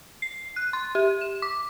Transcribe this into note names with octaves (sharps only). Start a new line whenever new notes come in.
C7
F#6
C6
G4
E7
D6